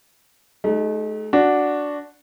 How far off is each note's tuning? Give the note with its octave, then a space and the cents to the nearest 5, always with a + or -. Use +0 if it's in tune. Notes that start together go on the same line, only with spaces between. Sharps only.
A3 -40 D#4 +0 G4 +10
D4 -5 F#4 -5